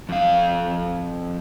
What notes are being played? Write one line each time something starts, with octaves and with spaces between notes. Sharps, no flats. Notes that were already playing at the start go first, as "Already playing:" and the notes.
F2 F5